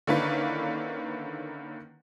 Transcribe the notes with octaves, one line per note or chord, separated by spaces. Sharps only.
D3 D#3 A#3 C#4 E4 B4